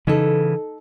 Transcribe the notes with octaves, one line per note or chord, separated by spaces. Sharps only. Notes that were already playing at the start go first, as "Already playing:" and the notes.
C#3 E3 D#4 A4